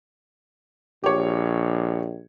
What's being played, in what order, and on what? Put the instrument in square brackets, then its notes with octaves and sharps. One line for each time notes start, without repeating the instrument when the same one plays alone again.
[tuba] A#1 [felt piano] G4 C#5